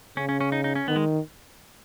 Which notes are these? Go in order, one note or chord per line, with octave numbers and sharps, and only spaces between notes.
C#3 C#4
C#4
C#4
D#4
D#4
C#4
D#3 B3
G#3